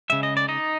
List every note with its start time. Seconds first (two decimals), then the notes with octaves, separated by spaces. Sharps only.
0.10 C#3 F3 G#3 E5
0.23 D#5
0.37 D5
0.48 D#4 D#5